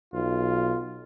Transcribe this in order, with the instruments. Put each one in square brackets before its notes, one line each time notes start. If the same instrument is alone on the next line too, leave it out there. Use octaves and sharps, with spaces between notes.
[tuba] B1 [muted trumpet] F4